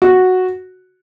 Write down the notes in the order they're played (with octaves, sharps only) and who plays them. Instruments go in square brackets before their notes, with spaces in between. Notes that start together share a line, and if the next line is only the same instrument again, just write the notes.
[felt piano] F#4